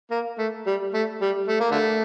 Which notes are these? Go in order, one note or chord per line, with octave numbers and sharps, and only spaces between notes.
A#3
A3
G3
A3
G3
A3
A#3
D3 A3